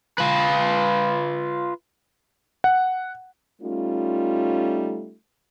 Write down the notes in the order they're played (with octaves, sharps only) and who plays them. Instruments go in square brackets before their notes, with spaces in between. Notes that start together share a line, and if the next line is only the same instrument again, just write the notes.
[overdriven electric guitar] F4 B4
[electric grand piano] F#5
[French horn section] G3 A3 C#4 D#4 F4